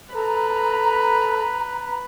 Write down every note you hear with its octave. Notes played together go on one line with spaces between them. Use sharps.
A4 B4 A#5